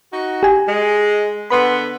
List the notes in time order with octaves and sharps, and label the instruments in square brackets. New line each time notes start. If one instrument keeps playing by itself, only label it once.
[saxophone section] D#4 F#4
[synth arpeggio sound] G4 G#5
[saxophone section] G#3
[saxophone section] D3 B3 [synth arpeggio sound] B5 C6